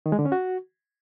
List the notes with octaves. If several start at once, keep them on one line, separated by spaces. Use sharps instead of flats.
D#3
G#3
D3
C#4
F#4